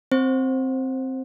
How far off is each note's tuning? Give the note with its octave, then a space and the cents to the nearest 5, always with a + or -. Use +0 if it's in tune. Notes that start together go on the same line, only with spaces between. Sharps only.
C4 +0 C5 +15